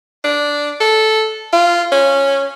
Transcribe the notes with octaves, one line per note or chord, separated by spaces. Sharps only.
D4
A4
F4
C#4